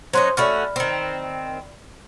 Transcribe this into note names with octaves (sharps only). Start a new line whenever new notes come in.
F#3 C#4 D#4 C5 C6
A3 C#4 F#4 D5 B5 F6
D#3 C4